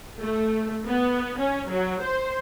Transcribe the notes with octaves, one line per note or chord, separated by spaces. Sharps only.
A3
B3
C#4
F#3
C5